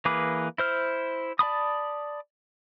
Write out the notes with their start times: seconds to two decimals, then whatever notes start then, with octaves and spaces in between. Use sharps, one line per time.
0.05 E3 A#3 G#4 B4 D6
0.58 E4 C5 F6
1.39 D5 A5 B5 D#6